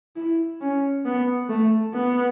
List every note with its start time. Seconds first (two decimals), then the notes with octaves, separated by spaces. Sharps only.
0.16 E4
0.61 C#4
1.05 B3
1.49 A3
1.94 B3